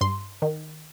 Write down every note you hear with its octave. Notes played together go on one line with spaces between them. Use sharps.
G2 C6
D#3